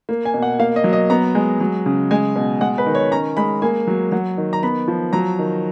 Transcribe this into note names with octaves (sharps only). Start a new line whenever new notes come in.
A#3
G#5
B2
F#5
A#3 F5
D#5
F#3
D#5
B3 A#5
G#3
F#3
C#3
G#3 G#5
B2
G#3 F#5
B4
D#3
C#5
C#4 A#5
G#3 B5
A#3 G#5
F#3
F#3 F#5
D#3
A#5
B3 B5
F3
F#3 A#5
D#3